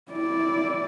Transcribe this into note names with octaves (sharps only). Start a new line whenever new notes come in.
E4 D5